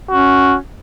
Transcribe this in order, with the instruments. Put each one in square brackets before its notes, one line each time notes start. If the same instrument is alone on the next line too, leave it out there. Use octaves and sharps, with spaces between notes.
[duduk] C#4 [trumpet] F#4